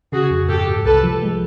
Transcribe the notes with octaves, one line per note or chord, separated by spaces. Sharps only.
C#3 F#4 G#4
F2
G#2 G4 A4
G#2
C2 A4 B4
F3
G#3